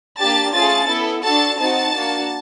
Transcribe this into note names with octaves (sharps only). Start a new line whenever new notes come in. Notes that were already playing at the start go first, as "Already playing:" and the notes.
A#3 D4 G4 A5 A6
A3 C#4 F4 G#4 A5 A6
B3 E4 A4
D4 F#4 A4 A5 A6
C4 D#4 F#4 A5 A6
A#3 D4 F#4